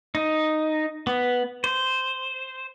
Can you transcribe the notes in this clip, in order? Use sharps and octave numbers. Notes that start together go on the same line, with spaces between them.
D#4
B3
C5